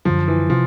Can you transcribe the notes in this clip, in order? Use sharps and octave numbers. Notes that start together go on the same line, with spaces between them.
F#2 D3 F3 F#3
E3
C3 F3